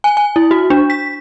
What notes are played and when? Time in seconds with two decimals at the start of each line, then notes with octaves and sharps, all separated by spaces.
0.04 G#5
0.17 G#5
0.36 E4
0.51 F#4
0.70 D4
0.90 B6